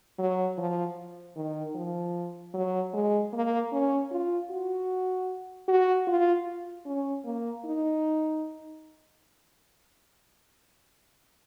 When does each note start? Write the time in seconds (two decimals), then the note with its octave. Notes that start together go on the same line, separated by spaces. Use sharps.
0.19 F#3
0.58 F3
1.36 D#3
1.75 F3
2.54 F#3
2.93 G#3
3.33 A#3
3.72 C#4
4.11 F4
4.50 F#4
5.68 F#4
6.07 F4
6.86 C#4
7.25 A#3
7.65 D#4